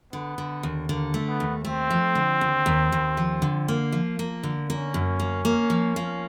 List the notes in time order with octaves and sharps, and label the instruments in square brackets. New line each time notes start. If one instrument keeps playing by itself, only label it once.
[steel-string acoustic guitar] D3 [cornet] B3
[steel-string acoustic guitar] D3
D#2
[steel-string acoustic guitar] D3 [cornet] A#3
[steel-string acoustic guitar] A3
[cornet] B3
[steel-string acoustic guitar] D#2
[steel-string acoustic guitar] A3 [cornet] C4
[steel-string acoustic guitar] F3
D3
D#2
D#2
D#2
F3
D3
A#3
F3
A#3
D3
[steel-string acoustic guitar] A#3 [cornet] C#4
[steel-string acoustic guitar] F#2
A#3
A#3
F3
A#3